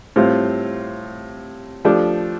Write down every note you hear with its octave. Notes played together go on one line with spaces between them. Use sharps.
A2 G3 C4 F4
F3 A3 D4 G4